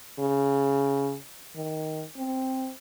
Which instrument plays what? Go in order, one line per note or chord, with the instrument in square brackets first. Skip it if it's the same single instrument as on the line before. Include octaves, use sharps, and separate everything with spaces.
[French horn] C#3
D#3
C4